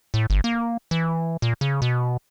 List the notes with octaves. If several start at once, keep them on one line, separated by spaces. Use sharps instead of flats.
A2
G1
A#3
E3
A#2
C#3
B2